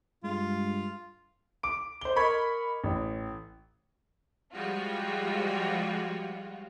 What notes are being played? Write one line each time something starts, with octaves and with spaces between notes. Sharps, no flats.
G2 G#3 F4
D6 D7
C5 G7
A#4 D#5 B5 C#6 G#6
A1
F3 G3 G#3 F4 F#4